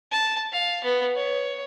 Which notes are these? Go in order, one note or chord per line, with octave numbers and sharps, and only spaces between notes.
A5
F5
B3
C#5